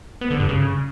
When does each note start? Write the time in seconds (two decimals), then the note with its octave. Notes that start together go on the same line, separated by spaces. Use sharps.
0.21 B3
0.30 D3
0.40 G2
0.49 C#3